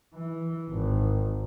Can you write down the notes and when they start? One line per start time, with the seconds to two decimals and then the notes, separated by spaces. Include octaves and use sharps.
0.14 E3
0.69 G#1